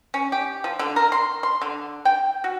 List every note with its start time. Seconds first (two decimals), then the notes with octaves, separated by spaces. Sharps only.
0.14 C#4
0.32 G4
0.64 F3
0.79 D3
0.96 A#4
1.12 C6
1.43 C6
1.61 D3
2.05 G5
2.44 F#4